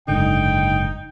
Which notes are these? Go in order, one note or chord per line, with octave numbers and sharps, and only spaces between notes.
F#1 G#2 D3 D#4 G5